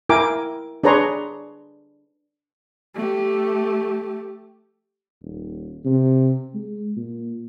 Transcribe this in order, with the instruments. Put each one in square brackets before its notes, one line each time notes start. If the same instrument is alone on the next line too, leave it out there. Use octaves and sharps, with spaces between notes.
[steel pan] E4 A#4 G5 G#5 D6
D4 G#4 B4 C#5 A#5 C6
[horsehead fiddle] A3 G4
[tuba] D#1
C3
G#3
A#2